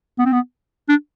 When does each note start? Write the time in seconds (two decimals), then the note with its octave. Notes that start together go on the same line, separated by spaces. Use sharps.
0.19 B3
0.26 C4
0.33 B3
0.89 D4